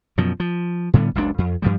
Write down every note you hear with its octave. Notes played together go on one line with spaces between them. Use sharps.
F#2 B2 F3
F3
A2 D3 G3 B3
F#1 C#2 C#3 D4
F2
G2 F3 G3